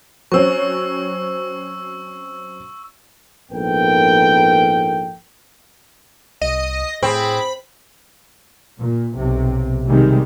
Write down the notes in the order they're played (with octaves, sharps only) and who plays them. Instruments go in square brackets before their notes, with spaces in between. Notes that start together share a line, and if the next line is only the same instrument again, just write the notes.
[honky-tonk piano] F#3 C4 C#4 [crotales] C#6 E6
[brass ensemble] A#1 G#2 B3 A4 A#4 G5
[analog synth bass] C2 [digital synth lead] D#5
[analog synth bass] A2 [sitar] C4 [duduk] G#4 [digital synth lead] B5
[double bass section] A#2
B1 C3
C3 D#3 G3 G#3